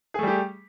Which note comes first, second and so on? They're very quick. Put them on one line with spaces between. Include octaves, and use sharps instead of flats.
G#4 A3 G3 G4